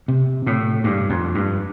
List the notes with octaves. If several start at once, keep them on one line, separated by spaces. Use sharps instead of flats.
C3
A2
G2
F2
G2